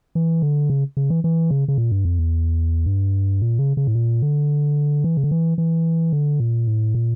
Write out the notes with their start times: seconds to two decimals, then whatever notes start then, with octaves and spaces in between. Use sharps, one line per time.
0.15 E3
0.42 D3
0.70 C#3
0.97 C#3
1.10 E3
1.24 E3
1.51 C#3
1.68 C#3
1.78 A#2
1.92 G2
2.05 F2
2.19 E2
2.86 G2
3.41 A#2
3.59 C#3
3.77 C#3
3.87 A2
3.95 A#2
4.22 D3
5.04 E3
5.17 C#3
5.24 D3
5.31 E3
5.58 E3
6.13 D3
6.40 A#2
6.67 A2
6.95 A#2